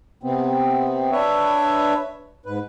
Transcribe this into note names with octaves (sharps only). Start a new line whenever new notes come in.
C3 B3 C4
D4 B4 C#5 E5
G#2 B4